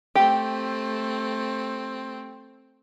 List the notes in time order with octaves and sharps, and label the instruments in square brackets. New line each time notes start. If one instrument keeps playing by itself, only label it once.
[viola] A3 C4 [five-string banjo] G4